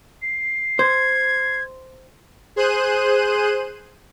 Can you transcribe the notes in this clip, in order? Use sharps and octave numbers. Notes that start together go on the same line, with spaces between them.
C7
C5 G#6
G#4 C5 F#6 D#7